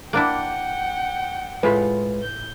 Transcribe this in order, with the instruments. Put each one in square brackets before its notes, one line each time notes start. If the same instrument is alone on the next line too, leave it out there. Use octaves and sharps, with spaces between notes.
[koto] A#3 D4 E4 [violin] F#5 G5
[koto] A2 [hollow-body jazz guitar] G#3 F4 B5 [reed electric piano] B4
[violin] G6